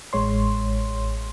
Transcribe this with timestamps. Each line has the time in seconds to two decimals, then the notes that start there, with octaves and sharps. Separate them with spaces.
0.13 A1 G#3 C#5 C6